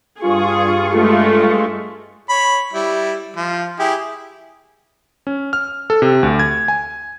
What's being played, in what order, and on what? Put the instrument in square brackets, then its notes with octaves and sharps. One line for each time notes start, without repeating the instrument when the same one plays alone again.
[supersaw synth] G2 F4 C#6 [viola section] G#4
[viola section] G#3 A3
[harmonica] C#5 B5
G3 E4
F3
E4 G4 G#4
[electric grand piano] C#4
F6
A4
C3
D2
G#6
G#5